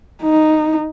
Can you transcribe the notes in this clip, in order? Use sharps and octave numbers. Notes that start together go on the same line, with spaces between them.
D#4